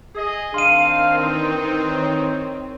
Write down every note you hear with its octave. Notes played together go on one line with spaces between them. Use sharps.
G#4 D#5
D#3 C4 D4 F5 C6 D#7
E3 D#4 C5
C#5